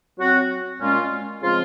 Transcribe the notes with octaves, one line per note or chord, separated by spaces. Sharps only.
F#3 C4 F#4
A#2 G#3 C#4 F4
C#3 F3 G#3 C4 F4